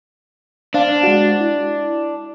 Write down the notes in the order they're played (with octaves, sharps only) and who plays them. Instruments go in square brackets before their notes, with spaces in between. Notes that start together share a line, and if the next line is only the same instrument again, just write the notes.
[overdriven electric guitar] D4 [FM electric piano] C5 F5 A5
[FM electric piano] G#3 F#4
E4